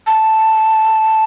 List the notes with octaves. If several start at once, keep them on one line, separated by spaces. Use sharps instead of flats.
A5